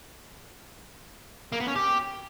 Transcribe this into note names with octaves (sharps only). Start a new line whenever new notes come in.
A#3
B3
C#4
G4